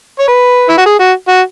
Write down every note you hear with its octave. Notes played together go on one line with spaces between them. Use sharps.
C#5
B4
E4
F#4
G#4
F#4
F#4